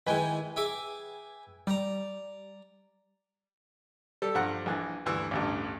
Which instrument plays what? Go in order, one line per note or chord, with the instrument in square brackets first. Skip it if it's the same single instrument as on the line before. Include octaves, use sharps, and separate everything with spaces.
[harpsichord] D#3 E3 G#3 [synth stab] B4 G5 G#5
[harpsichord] G#4 E5 D6
[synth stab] G3 [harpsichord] D5 A#5
[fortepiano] G3 A4
G2 F3 F#5 A#5
A#1 E3 F#6
D2 G2 E3 E6
A1 D2 G2